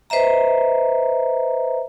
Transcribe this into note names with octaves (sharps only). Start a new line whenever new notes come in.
B4 C5 D#5 E5 A#5